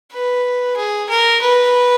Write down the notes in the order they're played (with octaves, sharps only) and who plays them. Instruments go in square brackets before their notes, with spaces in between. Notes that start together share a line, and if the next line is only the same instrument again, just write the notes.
[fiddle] B4
G#4
A#4
B4